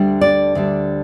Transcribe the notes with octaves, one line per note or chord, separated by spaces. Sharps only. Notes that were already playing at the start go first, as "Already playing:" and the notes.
Already playing: D2 D3 G3 D4
D5
D2 D3 G3 D4